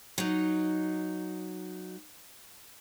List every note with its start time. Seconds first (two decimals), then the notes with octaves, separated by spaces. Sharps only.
0.18 F#3 D#4